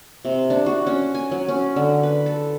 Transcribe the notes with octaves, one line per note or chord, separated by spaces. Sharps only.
C3
D4
F#4
C#4
G#5
F#3
C#4
D3
B4
A4